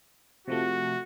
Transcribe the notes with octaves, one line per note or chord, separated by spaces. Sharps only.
C3 F3 A3 F#4